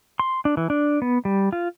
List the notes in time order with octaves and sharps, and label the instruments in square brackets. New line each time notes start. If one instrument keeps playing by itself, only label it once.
[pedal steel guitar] C6
D4
E3
D4
B3
G3
F4